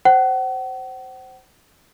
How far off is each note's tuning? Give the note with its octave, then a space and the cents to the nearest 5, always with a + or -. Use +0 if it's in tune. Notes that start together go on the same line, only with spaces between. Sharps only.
C5 +0 F#5 +40